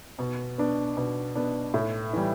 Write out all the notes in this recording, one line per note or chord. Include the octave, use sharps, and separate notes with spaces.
B2
B3 D4
B2
B3 D4
A2
E3 G3